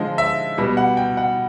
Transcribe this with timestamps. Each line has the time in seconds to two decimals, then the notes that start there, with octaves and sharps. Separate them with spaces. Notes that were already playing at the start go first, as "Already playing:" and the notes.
Already playing: D3 F3 G#3 D#5
0.18 E5
0.58 B2 G3
0.77 F#5
0.97 G5
1.17 F#5